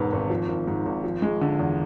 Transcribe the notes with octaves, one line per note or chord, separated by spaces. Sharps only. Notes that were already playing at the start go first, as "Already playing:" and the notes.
Already playing: E1 G#2 B3
G#1
F3
G#1
G#2
G#1
F3
G#3
D3
E2